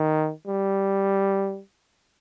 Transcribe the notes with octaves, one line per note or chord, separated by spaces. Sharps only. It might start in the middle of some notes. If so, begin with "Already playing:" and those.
Already playing: D#3
G3